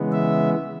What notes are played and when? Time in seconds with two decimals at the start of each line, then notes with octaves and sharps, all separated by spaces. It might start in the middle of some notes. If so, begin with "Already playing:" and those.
Already playing: C#3 E3 G#3 B3
0.13 E5